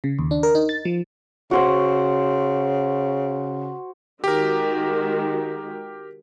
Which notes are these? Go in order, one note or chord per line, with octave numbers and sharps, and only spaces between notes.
C#3
D#2
D4
A#4
D#4
A6
F3
C#3 F#4 C5 F#5
D#3 G#3 F#4 G4 A#4